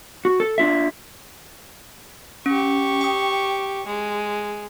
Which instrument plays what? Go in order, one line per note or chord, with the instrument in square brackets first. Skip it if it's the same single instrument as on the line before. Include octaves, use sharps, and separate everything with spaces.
[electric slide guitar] F#4
A4
D4 F4 E5
[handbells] C#4 [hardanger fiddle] G4 C#6
[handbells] G5 D#6
[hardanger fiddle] G#3